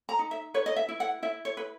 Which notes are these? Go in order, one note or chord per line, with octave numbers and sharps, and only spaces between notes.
A#5
D#4
E5
B4 C#5
D#5
E5
E4
F#5
E4 E5
C#5
B4